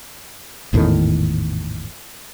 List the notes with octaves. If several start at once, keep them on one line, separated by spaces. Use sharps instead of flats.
G#1 E2 A2 D#3